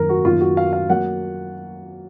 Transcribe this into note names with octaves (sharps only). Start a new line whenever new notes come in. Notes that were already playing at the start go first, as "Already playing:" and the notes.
Already playing: F#2 D#3 F#3 A#3 A#4
F#4
F#2 D#3 A#3 F4
F#4
F5
F5
F#3 A#3 F#5